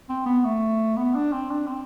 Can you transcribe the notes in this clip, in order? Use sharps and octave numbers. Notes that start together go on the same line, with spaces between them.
C4
B3
A3
B3
D4
C4
D4
C4